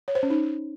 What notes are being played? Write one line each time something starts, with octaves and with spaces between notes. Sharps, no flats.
C#5
C5
C#4
D#4